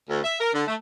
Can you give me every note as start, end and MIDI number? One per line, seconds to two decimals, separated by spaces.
0.10 0.21 38
0.24 0.38 76
0.41 0.50 70
0.54 0.63 50
0.67 0.75 57